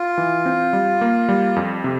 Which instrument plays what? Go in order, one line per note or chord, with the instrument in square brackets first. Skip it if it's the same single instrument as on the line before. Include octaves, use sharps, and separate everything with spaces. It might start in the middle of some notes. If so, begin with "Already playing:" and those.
Already playing: [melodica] F4
[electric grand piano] E3
C4
G3
A#3
G3
F2
C3